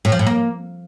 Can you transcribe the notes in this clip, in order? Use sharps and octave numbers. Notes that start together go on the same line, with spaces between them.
A2
F3
A2
A#3